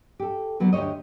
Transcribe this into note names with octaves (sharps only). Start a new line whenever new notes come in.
G4 A4
D3 F#3 B3 D4
D2 G4 C5 C#5 D#5